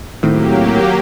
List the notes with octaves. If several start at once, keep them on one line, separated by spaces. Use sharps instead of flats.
A2 D#3 F#3 A#3 C4 G4